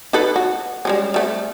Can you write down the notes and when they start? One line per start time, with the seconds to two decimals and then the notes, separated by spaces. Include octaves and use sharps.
0.13 D#4 A4 B4
0.36 F#4
0.85 G3 G#3 C#4
1.14 G3 A3 C4